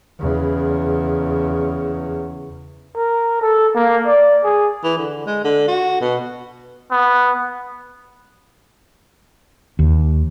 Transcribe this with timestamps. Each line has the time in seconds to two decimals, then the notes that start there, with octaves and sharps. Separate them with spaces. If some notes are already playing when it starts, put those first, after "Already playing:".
0.20 E2 C#3
2.96 A#4
3.41 A4
3.75 A#3
4.06 D5
4.44 G#4
4.84 E3
4.98 D3
5.26 G#3
5.44 D3
5.68 F#4
6.01 B2
6.91 B3
9.79 D#2